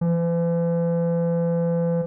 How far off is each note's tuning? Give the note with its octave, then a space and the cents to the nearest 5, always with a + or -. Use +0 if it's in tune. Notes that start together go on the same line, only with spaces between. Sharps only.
E3 +45